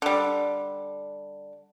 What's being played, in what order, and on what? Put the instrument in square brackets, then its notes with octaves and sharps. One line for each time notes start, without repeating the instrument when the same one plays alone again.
[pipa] D3 G3